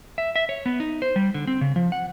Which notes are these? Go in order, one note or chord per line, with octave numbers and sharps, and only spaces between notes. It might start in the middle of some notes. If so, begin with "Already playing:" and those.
E5
E5
C#5
B3
D#4
C5
G3
D3
C4
C#3
F3
F#5